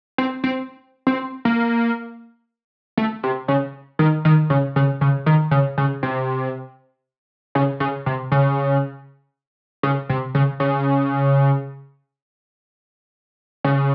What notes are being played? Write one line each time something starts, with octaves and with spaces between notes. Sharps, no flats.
C4
C4
C4
A#3
A3
C3
C#3
D#3
D#3
C#3
C#3
C#3
D#3
C#3
C#3
C3
C#3
C#3
C3
C#3
C#3
C3
C#3
C#3
C#3